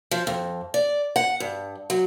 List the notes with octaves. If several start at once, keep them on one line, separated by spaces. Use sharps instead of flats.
F3
F2
D5
F#5
G2
F#3